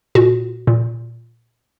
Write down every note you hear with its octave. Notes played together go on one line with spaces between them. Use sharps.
A#2 F#4
A#2